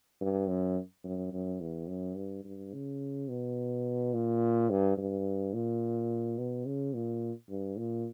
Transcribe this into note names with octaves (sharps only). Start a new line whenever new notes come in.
G2
F#2
F#2
F#2
E2
F#2
G2
G2
C#3
B2
A#2
G2
G2
A#2
B2
C#3
A#2
G2
A#2